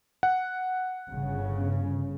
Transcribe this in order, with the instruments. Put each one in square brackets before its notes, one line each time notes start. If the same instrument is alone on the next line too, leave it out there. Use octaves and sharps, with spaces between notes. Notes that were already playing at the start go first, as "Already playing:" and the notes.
[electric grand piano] F#5
[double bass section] G1 C#3